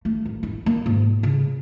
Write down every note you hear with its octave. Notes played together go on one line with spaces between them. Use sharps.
A3
A1
E4
A#3
G#2
C#3